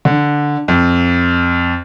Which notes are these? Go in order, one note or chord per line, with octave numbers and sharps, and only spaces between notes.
D3
F2